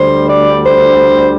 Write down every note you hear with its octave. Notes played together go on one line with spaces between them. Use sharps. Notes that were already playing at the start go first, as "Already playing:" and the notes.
Already playing: D2 D3 G3 C5
D5
C5